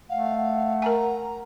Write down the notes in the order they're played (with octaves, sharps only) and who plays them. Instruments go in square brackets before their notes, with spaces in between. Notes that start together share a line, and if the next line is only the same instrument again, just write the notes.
[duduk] A3 [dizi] F5 [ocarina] F#5
[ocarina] F#5
[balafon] A#4 G#5 [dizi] A#5